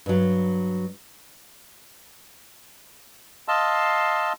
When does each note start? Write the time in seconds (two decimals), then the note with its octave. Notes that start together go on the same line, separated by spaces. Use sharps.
0.06 G2 F#3
3.48 D#5 F5 A5 C6 E6